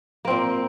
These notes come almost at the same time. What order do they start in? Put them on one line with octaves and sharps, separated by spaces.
A#3 C4 A#2